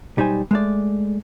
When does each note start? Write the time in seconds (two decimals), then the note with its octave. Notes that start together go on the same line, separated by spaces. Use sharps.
0.17 B1 G3 D#4 C5 G#5
0.51 G#3 A3 D5